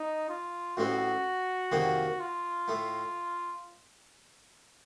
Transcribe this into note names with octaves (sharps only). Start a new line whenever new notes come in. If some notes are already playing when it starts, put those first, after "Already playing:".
Already playing: D#4
F4
A1 A2 F#3 C4 F#4
F2 C3 D#3 F#3 A#3
F4
A2 A3